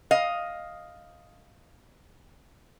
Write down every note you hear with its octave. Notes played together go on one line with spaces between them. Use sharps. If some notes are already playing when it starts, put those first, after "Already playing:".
D#5 F5